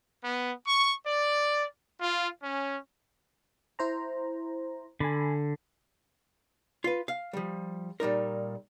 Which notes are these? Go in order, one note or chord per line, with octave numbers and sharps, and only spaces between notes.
B3
C#6
D5
F4
C#4
E4 C5 A#5
D3 G#5 B5
F4 B4
F5
F3 G3
A#2 G3 D#4 A#4